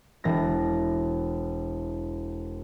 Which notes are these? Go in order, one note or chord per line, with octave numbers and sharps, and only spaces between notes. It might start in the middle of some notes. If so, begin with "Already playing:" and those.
E1 A#6